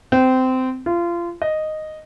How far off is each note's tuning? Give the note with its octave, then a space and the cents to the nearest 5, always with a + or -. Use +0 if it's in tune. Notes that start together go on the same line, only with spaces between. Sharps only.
C4 -20
F4 -25
D#5 -5